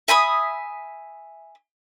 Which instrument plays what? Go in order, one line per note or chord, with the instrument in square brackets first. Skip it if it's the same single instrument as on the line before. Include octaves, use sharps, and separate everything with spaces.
[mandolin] E5 G#5 B5 D#6